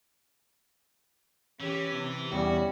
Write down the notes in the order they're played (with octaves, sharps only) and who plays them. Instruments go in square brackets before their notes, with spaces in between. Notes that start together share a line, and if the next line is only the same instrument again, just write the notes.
[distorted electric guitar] E3 [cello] C#4 G4
[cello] C3
[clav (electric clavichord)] E2 [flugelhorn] G3 [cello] C#4 [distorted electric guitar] F#4